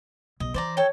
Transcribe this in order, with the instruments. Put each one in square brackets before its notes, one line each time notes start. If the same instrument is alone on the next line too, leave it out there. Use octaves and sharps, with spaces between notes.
[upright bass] B1 [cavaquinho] D#5
[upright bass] E3 [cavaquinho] C5 D5 A#5
[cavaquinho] A4 G5 [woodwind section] C#5